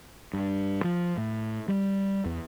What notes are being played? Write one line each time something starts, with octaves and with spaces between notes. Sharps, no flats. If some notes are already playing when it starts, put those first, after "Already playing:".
G2
F3
A2
G3
E2